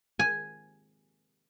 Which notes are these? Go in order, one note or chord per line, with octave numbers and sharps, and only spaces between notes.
G#5